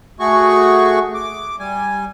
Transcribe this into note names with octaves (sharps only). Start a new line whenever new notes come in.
A3 F#4 G#4 C#6
D6
G3 G#5